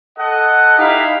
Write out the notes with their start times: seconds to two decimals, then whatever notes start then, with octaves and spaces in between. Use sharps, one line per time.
0.18 A4 D#5 F#5
0.78 D#4 E4 G4 F5